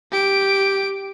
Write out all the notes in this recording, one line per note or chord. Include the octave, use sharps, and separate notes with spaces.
G4 D7